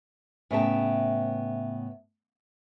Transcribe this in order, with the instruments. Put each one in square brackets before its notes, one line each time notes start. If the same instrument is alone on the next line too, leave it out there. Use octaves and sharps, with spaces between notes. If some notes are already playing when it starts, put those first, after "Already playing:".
[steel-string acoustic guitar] A2 C#3 B3 E5 G5 A5